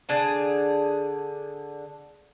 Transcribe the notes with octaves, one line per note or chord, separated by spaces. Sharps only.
D3 D4 G#4 A5